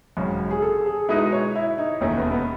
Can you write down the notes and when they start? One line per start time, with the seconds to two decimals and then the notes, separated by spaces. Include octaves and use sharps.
0.17 G#1 F#2 C#3
0.51 G#4
0.62 A4
0.86 G#4
1.09 B2 G#3 D#4 E4 G#4 B4
1.32 C#5
1.56 E4
1.78 D#4
2.01 E1 D#2 D#3 A3 C#4
2.17 B3
2.32 B3